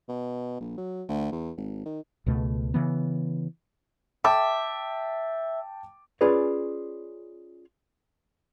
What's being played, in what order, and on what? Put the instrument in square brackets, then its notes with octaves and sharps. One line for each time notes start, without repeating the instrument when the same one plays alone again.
[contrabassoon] B2
A#1
F#3
D2
E2
G#1
D#3
[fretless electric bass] C#2 B2 A3
C#3 E3 B3
[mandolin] E5 [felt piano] G5 A5 D6
[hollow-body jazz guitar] C#4 F4 G#4 B4 C#5 D5